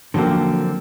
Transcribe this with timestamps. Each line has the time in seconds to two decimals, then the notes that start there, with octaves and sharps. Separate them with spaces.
0.14 D3 F3 F#3 A#3 C4